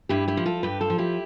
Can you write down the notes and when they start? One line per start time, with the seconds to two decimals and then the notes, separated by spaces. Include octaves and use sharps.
0.09 G2 E4 G4
0.28 E4 G4
0.37 F3
0.46 F4 A4
0.63 G2 G4 B4
0.81 F4 A4
0.90 F3
0.98 E4 G4